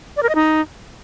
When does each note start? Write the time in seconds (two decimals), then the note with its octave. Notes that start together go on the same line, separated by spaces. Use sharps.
0.17 D5
0.23 A#4
0.29 D#5
0.35 D#4